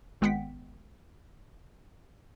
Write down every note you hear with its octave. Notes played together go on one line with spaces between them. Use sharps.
G#1 G#3 B3 F#5 G5 B6